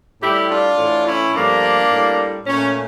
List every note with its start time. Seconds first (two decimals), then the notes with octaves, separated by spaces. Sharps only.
0.21 A2 G3 E4 G4
0.50 D4 F4
0.78 A2 E3 A3
1.06 C#4 E4
1.34 G2 F3 A3 A#3 D4
1.90 A2 G3
2.47 A#2 A3 C#4